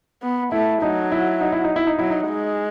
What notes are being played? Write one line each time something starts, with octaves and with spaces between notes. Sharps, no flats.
B3
A3 E4
F#3 D#4
E4
D#4
E4
D#4
E4
D#4
F#3 E4
D#4
G#3